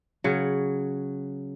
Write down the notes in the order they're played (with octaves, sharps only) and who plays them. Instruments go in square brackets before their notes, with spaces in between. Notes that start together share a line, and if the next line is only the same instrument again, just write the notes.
[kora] C#3 F#3